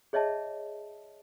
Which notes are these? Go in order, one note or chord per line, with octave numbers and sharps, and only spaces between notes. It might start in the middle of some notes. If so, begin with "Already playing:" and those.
G#4 C#5 D#5 E5 A5